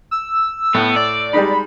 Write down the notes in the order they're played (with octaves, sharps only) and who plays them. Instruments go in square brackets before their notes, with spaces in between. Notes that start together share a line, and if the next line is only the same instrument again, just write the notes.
[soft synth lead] E6
[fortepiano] A2 [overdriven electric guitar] B3
[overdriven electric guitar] D5
[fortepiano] G3 G#3 D#4 [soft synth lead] B5